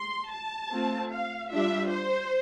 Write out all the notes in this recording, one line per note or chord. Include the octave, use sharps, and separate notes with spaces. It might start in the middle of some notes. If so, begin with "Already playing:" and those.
Already playing: C6
A5
A3 C4 F4
F5
G3 D4 F4 E5
C5